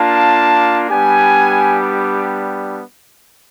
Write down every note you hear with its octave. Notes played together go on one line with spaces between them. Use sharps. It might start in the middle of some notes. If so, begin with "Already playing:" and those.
Already playing: A#3 D4 F4 A5
G3 B3 D4 G4 G#5